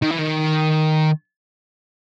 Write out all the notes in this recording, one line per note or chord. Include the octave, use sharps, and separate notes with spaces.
D#3
E3
D#3